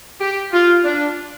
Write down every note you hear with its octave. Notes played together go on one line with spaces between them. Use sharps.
G4
F4
D4